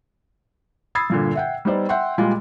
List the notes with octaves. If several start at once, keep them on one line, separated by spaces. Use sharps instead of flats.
B5 D#6 E6 G#6 A6 C7
G2 A#2 D3
E5 F#5 G5
G3 B3 D#4 C5 D5
E5 F#5 G5 C6
A#2 G3 G#3 F4